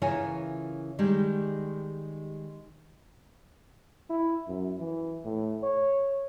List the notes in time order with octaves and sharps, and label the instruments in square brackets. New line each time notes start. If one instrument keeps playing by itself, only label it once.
[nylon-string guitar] C#3 E3 F4 A#4 C#5 G#5
D#3 G3 G#3 G4
[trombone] E4
F#2
E3
A2
C#5